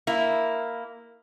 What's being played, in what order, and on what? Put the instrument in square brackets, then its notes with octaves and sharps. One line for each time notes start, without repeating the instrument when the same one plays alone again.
[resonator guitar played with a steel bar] A#3 E4